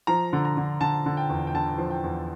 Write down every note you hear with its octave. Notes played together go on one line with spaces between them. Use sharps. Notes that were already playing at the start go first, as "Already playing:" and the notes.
F3 A#5
D3
A#5
D3
D3 A5
D3
G5
E2
G5
D3 A5
F3
G5
E2